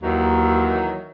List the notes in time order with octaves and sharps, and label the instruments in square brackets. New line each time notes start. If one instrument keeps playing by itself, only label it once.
[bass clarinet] D#2 [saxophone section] D#3 E3 F#3